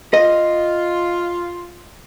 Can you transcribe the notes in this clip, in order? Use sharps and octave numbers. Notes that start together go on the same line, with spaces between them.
F4 D#5